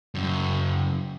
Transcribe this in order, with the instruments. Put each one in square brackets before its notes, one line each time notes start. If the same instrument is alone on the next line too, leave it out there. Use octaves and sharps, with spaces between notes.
[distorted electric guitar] F#2 C#3